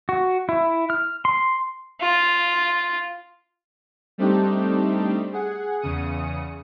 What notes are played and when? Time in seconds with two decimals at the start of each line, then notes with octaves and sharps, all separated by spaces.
0.09 F#4
0.49 E4
0.90 F6
1.25 C6
2.01 F4
4.18 G3 A3 C4 D4 D#4 G4
5.33 G#4 F#5
5.80 E2 C#3 D#6 C#7